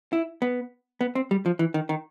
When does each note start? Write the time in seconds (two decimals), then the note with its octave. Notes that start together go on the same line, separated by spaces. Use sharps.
0.13 E4
0.42 B3
1.01 B3
1.15 C4
1.31 G3
1.46 F3
1.59 E3
1.74 D#3
1.89 D#3